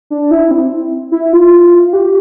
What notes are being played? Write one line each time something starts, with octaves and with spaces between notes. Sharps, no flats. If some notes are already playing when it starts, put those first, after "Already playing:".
D4
E4
C4
E4
F4
G4